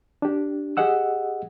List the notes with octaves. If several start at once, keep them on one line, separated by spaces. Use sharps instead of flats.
D4 G4
G4 G#4 D#5 F#5 E6